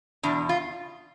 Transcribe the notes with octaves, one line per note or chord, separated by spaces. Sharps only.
E2 B2 D4
F4